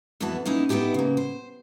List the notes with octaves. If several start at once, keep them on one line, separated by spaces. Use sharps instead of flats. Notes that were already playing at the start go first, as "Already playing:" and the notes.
F2 E3 B3 E4 F#4 A5
A#3 C#4 D#4 E4
B3 D#4 E4 G4 G#4
C#3 A#3
C5